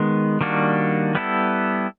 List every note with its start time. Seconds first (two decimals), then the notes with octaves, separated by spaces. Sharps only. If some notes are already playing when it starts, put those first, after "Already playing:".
Already playing: D#3 G#3 B3
0.41 D#3 G3 A#3 D4 F#4
1.15 G3 B3 E4 A4